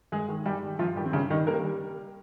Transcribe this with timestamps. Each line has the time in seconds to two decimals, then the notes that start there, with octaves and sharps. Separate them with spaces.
0.12 G2 G#3 G#4
0.28 D#3
0.46 G2 G3 G4
0.63 G3
0.79 G2 F3 F4
0.96 D#3 G3 G4
1.05 C4
1.13 G2 C#3 C#4
1.30 D#3 G3 D#4
1.47 G3 A#3 A#4
1.64 G3